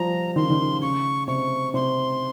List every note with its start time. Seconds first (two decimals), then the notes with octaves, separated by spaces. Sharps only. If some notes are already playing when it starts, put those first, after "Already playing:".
Already playing: F3 G3 A#5
0.36 D#3 C6
0.43 C#3
0.50 D#3
0.82 C#3 C#6
1.28 C3 C#6
1.74 C3 C6